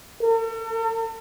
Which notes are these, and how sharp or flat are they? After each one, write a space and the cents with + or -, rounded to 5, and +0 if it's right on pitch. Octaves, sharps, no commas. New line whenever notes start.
A4 +45